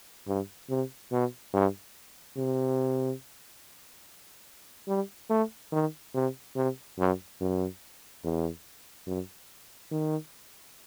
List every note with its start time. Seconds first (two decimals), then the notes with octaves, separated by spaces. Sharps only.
0.27 G2
0.69 C3
1.12 B2
1.53 G2
2.37 C3
4.88 G3
5.30 A3
5.72 D#3
6.14 C3
6.56 C3
6.99 F#2
7.40 F#2
8.24 E2
9.07 F#2
9.91 D#3